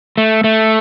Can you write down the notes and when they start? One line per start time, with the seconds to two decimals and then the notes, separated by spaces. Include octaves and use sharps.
0.18 A3
0.44 A3